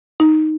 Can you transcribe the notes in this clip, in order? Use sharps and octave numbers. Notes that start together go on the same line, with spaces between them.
D#4